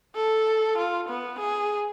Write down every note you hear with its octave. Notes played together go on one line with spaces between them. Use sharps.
A4
F4
B3
G#4